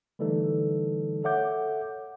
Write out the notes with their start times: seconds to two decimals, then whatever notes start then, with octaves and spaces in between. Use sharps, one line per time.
0.19 D3 E3 G3 A3 D#4 A4
1.24 A4 C#5 E5 F#5 D6 G6